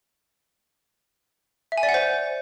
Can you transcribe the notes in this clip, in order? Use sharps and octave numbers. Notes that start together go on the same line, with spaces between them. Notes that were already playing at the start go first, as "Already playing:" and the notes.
E5
G#5
D5
F#5
C5